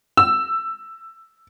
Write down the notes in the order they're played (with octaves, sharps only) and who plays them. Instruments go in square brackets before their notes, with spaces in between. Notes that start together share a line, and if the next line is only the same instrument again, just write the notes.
[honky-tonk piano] E6